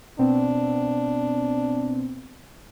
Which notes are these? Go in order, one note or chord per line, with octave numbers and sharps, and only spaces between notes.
B2 B3 C4 D4